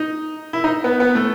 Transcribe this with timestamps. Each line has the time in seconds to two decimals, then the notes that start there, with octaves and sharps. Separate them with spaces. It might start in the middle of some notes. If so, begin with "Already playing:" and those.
Already playing: D#4
0.53 E4
0.64 D#4
0.84 B3
1.00 B3
1.15 A3